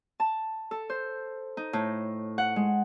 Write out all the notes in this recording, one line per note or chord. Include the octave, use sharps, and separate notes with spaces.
A5
A4
C5
D#4
A2
F#5
G#3